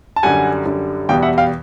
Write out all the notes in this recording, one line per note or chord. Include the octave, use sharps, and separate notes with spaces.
A5
F#2 D3 G3 F#5 G#5
F#2 D3 G3
E2 B2 G3 B3 F5 G5
E5 F#5
F5 G5